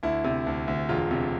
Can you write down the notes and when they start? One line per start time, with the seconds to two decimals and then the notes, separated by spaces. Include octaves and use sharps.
0.03 D2 E4
0.24 C3
0.47 D2
0.68 D2
0.89 E1 F4
1.11 C3